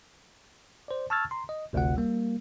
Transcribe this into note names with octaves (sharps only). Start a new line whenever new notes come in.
C5 D5
A5 C#6 E6 F6 G#6 A6
A#5 C6
D#5
G#1 D2 C3 F4 F#5
G3 A#3